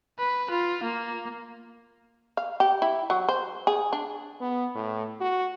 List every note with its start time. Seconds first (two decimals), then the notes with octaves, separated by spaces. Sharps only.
0.19 B4
0.50 F4
0.83 A#3
2.37 F5
2.60 G4
2.82 E4
3.10 F#3
3.29 C5
3.67 G#4
3.93 D4
4.41 B3
4.75 A2
5.21 F#4